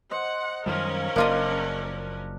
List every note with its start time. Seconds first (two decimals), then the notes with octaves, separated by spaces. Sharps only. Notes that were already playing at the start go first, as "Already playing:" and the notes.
0.11 C5 D#5 F#5
0.66 F#2 D#3 F3 G3 C#4 A#4 F5
1.16 F#1 A#3 D4 F4 D#5